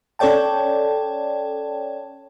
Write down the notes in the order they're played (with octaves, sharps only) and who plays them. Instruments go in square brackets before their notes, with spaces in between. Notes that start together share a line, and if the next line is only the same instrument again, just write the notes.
[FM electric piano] C#4 A4 C#5 D5 G5 A5